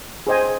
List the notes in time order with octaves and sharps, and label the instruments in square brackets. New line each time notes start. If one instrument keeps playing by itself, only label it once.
[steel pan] G#4 C5 D#5 G#5